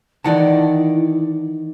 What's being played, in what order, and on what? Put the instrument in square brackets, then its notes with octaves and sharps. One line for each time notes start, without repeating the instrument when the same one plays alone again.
[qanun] D#3 D5 [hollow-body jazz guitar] E3 F#5 A5 [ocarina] E4